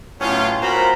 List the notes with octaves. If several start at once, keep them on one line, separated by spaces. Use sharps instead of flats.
A2 F#3 B3 C#4 F4
A#2 F#4 A#4 C5 A#5 B5